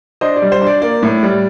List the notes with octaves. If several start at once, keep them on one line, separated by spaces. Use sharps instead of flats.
D4 C5 D#5
D5
G3
C5
D4
D5
A#3 D5
A2
G3